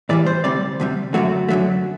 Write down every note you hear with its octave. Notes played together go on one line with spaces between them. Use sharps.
A2 E3 G3 D5
C5
D2 C3 G3 D5
D2 C3 G3
F#2 D3 F#3 A3 F#4
F#2 D3 F#3 A3